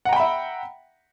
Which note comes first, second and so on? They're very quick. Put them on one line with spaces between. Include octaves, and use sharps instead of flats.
F#5 A#5 G5 B5 E5